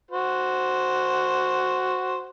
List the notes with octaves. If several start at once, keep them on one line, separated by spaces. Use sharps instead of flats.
F#4 C5